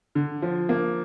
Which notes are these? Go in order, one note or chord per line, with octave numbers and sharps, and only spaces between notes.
D3
F3
A#3